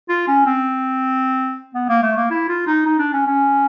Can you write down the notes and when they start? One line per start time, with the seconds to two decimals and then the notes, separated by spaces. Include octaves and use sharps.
0.09 F4
0.27 C#4
0.46 C4
1.74 B3
1.89 A#3
2.02 A3
2.17 A#3
2.31 E4
2.48 F4
2.67 D#4
2.85 D#4
2.99 D4
3.13 C#4
3.27 C#4